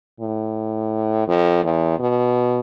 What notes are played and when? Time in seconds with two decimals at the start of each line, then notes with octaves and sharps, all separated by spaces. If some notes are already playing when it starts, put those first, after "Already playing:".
0.20 A2
1.28 F2
1.64 E2
1.99 B2